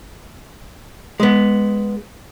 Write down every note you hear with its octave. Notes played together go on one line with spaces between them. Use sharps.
G#3 B3